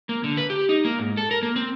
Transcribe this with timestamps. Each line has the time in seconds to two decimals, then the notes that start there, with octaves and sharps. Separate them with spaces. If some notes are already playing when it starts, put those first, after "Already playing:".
0.09 A#3
0.24 D3
0.37 B4
0.50 G4
0.69 D#4
0.85 A#3
0.99 G#2
1.17 A4
1.31 A#4
1.43 A#3
1.56 C4